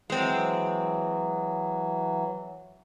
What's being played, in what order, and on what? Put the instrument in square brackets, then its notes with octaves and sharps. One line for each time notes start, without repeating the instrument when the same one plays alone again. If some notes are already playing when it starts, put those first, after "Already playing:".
[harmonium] E3 F#3 [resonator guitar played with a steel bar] G#3 C4